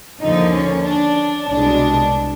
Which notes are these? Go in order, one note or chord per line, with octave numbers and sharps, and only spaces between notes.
D#2 D3 F3 D#4
C#4
D4
C2 B2 G#3 D4